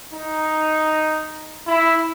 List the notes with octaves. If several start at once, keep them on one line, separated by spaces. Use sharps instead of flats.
D#4
E4